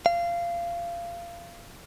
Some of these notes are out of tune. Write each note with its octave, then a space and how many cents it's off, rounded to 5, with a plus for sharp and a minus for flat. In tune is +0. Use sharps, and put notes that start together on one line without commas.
F5 -20